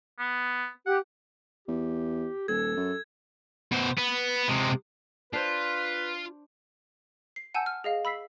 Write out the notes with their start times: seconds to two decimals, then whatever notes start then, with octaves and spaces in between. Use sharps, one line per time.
0.19 B3
0.86 G4 F#5
1.68 E2 G4
2.48 D#1 A4 G#6
2.77 F#2
3.72 B2 C5
3.98 B3
4.49 C3 G#3
5.33 D4 F4 B4 C5
7.36 C7
7.54 F#5 G#5 A5 E6 G6
7.66 F6
7.84 G#4 D#5 F5
8.05 B5 E6 B6 C7